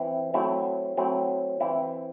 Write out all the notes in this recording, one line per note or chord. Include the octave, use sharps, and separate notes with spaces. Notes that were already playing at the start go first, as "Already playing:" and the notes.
Already playing: E3 C4 E4
F#3 A3 C4 E4
F#3 A3 C4 E4
E3 C4 E4